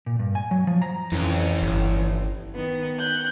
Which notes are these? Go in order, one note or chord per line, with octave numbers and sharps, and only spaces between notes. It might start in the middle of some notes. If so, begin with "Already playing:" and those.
A#2
G2
G#5
F#3
F3
A#5
F2 E3 C#4
G1
D#3 B3
F#6 G6